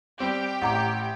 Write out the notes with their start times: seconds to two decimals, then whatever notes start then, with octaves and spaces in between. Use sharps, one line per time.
0.20 G3 C4 G4
0.62 A1 F#5 A#5 D6